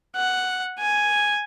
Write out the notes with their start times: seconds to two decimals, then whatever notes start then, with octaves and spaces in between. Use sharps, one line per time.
0.16 F#5
0.79 G#5